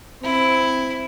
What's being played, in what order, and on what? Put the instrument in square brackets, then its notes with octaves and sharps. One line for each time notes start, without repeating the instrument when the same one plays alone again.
[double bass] C4 [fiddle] E4